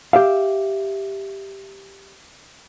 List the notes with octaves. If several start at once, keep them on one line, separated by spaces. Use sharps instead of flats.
G4 E5 F5